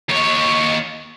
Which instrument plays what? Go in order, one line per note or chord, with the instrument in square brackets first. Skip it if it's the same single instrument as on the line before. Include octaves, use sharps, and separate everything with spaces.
[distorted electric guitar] D#2 C#5